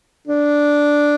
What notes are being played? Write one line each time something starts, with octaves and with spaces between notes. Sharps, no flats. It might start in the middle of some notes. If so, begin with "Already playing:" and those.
D4